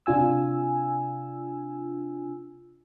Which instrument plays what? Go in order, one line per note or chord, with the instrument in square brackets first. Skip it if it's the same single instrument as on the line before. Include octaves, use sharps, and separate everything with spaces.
[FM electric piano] C3 D4 F4 G#5 E6